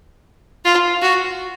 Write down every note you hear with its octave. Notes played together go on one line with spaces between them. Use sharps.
F4
F#4